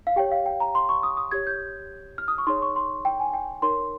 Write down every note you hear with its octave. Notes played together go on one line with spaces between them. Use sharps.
F5
G4 C#5 G5
F5
G5
A#5
C6
C#6
D#6
D#6
G4 C#5 G#6
G6
F6
D#6
C#6
D#4 G#4 C#5 C6
C#6
C6
G5
G#5
G5
D#4 A#4 C#5 C6